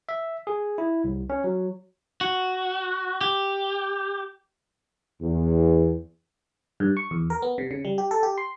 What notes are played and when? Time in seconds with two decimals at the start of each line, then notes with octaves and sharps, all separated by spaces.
0.09 E5
0.47 G#4
0.78 E4
1.04 C2
1.30 C#4
1.44 F#3
2.21 F#4
3.21 G4
5.21 E2
6.80 G2
6.97 C#6
7.11 E2
7.30 A#4
7.42 B3
7.58 C3
7.71 C#3
7.85 G3
7.98 G4
8.11 A4
8.23 G4
8.38 C6